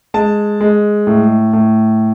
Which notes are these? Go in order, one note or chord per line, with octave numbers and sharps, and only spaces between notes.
G#3 A5
G#3
A2
A2